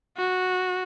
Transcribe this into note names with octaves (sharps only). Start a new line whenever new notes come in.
F#4